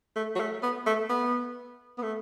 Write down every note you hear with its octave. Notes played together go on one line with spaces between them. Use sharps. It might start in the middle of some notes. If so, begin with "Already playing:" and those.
A3
F#3
A3
B3
A3
B3
B3
A3